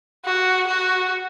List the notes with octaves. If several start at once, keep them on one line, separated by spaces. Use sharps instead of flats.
F#4
F#4